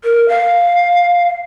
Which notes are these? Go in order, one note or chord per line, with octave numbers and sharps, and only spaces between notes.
A#4
F5